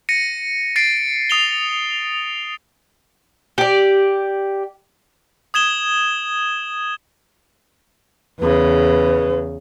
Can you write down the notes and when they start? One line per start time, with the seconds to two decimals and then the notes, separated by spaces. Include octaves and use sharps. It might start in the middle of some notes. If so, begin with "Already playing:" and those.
0.09 A#6 C#7 D#7
0.76 A6 A#6 C7 D7
1.30 D#6 F7 G7
3.58 G4 D5
5.54 D#6 G#6 E7 G7
8.40 E2 C#3 B4